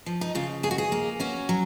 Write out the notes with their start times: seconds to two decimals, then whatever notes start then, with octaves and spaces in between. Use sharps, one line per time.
0.06 F3
0.21 D#4
0.35 C#3 F4
0.63 D#2 G#4
0.71 F#4
0.78 G#4
0.92 A#3
1.20 C#4 F#4
1.49 F#3